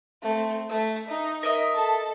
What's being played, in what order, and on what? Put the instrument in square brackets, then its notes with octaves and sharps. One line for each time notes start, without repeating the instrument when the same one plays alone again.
[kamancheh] A3 C4
[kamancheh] A3 [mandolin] E5
[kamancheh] D#4
[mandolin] A#4 D#5 E5
[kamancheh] A4 A5